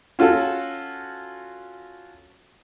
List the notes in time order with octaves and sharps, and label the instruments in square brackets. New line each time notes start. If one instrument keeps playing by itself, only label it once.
[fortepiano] C#4 F4 F#4 A4